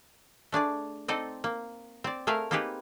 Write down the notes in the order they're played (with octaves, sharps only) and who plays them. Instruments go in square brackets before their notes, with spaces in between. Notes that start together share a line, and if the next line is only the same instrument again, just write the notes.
[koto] A3 D4 G#4 D5
C4 D#4 A4 D5 D#5
A#3
C4 D5
A3 G#4 A#4 E5 F5
A#3 C4 D#4 G4 G#4 B4